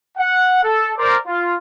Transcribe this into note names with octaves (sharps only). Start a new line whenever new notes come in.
F#5
A4
A#4 C5 D5
F4